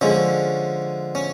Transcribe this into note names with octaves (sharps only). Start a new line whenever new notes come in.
D3 F3 G#3 C#4
C#4